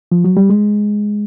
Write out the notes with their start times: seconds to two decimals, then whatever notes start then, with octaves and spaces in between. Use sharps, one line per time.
0.12 F3
0.24 F#3
0.37 G3
0.50 G#3